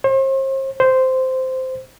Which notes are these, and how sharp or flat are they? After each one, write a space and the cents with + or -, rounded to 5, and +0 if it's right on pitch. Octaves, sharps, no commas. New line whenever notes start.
C5 +40
C5 -10